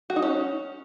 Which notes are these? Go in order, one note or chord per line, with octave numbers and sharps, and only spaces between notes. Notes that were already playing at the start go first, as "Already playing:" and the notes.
F#4
D#4
C#4